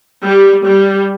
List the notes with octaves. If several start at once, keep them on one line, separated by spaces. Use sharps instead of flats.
G3
G3